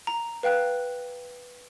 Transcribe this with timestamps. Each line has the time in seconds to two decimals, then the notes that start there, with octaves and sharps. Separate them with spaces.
0.07 A#5
0.43 B4 F5 G5 F#6